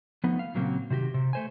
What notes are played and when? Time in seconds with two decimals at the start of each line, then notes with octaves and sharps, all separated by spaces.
0.24 F3 A3 B3 D#4
0.39 F5
0.54 A#2 C#3 F#3 A#3 C4
0.90 C3 D#3 F#4 G4
1.14 C3
1.33 A3 C5 G#5